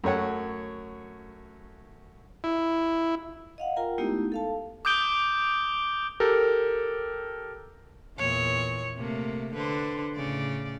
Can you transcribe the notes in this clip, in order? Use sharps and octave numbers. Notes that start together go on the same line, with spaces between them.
F#2 A3 C#5 F#5
E4
D#5 F5 F#5
F4 A#4 G5 A#5
G#3 A3 B3 D#4 E4 G4
A4 F5 A5
D6 D#6 G6 D7 G7
G4 A4 A#4
E2 A#2 C#5
C3 A3 A#3
D3 B4 C5
A2 C#3 D5